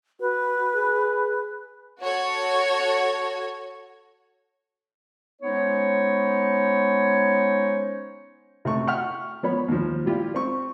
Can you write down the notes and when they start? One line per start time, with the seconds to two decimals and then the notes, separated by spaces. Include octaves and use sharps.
0.21 F#4 B4
0.75 G#4
2.00 F#4 A4 C#5
5.42 G#3 B3 C#4 D#4 C5 C#5
8.65 C3 A3 C#6
8.87 E5 F#5 G5 C#6 F6
9.43 F3 B3 C#5 B5
9.68 D#2 F3
10.05 G3 E4 F4 G4
10.34 C4 C#6